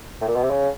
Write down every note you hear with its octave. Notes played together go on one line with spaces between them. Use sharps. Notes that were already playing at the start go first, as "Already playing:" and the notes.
A2
A#2
B2
C3
C#3